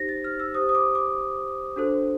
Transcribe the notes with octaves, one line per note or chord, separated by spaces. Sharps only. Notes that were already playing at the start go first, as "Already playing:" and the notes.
Already playing: D#4 G4 C5 A#6
A6
F6
E6
G4 C5 D#6
D#6
D6
D6
D4 F#4 A4 C5